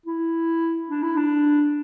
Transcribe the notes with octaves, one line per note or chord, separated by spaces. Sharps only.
E4
D4
E4
D4